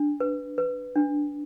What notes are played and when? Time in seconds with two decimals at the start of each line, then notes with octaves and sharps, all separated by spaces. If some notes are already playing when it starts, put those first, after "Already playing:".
Already playing: D4
0.20 B4
0.58 B4
0.96 D4